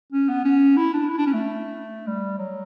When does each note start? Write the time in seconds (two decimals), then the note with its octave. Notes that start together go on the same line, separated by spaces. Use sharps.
0.12 C#4
0.29 B3
0.45 C#4
0.77 E4
0.93 D4
1.09 E4
1.18 D4
1.26 C#4
1.33 A3
2.07 G3
2.38 F#3